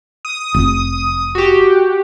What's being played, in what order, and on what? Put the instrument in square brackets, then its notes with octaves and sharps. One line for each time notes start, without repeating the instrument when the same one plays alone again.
[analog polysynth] D#6
[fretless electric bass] F1
[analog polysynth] F#4 G4